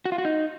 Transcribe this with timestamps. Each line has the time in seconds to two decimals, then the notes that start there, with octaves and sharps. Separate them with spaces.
0.05 F#4
0.12 F4
0.18 F#4
0.25 D#4